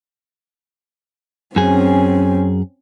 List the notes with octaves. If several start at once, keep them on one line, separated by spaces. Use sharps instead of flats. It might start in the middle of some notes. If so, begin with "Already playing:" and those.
F#2 C4 C#4 G#4